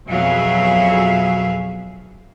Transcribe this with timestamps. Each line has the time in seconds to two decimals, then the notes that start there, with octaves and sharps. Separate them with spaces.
0.11 F2 B2 F#3 G#4 E5 F5